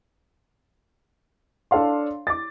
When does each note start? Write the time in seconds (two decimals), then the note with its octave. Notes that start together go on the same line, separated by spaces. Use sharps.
1.71 D4 A4 C#5 F5 C6
2.27 D6 A6